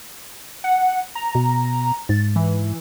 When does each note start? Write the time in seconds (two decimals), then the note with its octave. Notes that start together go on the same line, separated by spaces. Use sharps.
0.64 F#5
1.15 A#5
1.35 B2
2.09 G#2 A6
2.36 E3